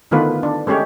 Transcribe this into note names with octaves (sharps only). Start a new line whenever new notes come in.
D3 D#3 A3 B3 F4 B4
D4
G#3 A3 C#4 G4 C#5